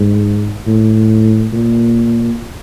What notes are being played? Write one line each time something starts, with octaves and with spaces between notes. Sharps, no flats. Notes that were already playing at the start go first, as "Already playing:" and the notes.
Already playing: G#2
A2
A#2